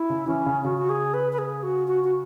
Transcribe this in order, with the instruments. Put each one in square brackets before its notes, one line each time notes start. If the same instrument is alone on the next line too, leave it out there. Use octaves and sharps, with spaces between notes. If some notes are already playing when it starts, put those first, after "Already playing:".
Already playing: [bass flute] E4
[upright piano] C#3
[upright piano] E3 [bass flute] C#4
[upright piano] C#3
[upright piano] C#3 [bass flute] F#4
[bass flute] F#4
G#4
B4
B4
G#4
F#4
F#4
F#4